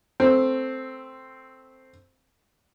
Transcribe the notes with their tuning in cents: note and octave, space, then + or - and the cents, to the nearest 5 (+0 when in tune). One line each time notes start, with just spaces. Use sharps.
A3 +0 C4 +0